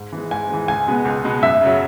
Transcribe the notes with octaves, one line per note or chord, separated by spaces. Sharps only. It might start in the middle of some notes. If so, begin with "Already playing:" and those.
Already playing: G#2
E3 G#3
G#2 G#5
E3 G#3
C#2 G#5
B2 G#3 B3
C#2
B2 G#3 B3
F#2 E5
C#3 F#3